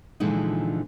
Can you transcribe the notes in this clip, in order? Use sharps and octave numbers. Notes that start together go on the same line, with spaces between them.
A#2 D3 E3 F3 G#3 D#4